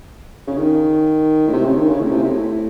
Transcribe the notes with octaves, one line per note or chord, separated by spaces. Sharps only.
C#3
D#3
A2
C3
C#3
D#3
C#3
A2
C3
A2